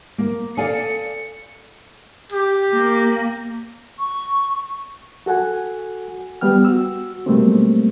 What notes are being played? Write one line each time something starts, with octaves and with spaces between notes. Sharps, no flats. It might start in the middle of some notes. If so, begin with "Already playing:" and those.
A#3
A4 D5 F5 G#5 C#7
G4
A#3
C#6
F#4 A4 F#5 G#5
G3 B3 G5 F6
F#4 E6
B2 F#3 G3 A3 A#3 C4